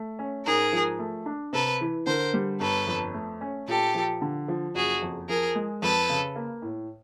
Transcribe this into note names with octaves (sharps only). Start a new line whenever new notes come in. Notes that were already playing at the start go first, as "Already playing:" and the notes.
Already playing: A3
C#4
G#2 G#4 A#4
F3
A3
D4
C3 A4 B4
E3
D3 A#4 C5
G3
G1 A4 B4
F2
A3
C#4
A#2 G4 A4
F3
D3
F3
F#1 F#4 G#4
F2
F3 G#4 A#4
G#3
F2 A4 B4
C#3
A#3
A2